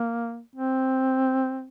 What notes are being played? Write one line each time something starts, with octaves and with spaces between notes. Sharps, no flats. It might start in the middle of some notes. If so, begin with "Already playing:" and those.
Already playing: A#3
C4